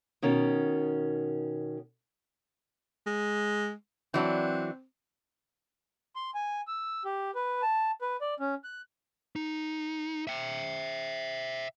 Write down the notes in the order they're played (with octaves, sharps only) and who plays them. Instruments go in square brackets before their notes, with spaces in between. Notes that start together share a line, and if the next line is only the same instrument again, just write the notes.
[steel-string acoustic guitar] B2 D#3 C#4
[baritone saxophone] G#3
[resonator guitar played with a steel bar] E3 F#3 D4 [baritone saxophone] C4
[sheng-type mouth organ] C6
G#5
E6
G4
B4
A5
B4
D5
C#4
F#6
[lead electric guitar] D#4
E5 G5